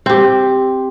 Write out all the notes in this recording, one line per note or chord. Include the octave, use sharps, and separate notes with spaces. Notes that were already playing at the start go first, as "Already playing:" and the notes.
C4 G4